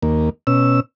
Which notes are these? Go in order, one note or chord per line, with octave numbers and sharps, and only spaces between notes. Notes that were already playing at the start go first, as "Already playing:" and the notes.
D#2 A#3
B2 C#4 E6